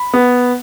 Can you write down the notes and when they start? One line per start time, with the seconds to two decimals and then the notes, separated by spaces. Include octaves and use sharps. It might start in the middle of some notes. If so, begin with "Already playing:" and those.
Already playing: B5
0.14 B3